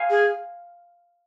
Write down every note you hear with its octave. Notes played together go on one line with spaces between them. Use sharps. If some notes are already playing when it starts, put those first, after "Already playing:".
Already playing: F5 G#5
G#4